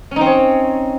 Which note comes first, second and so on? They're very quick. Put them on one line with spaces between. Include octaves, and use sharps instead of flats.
C#4 D#4 C4 C#5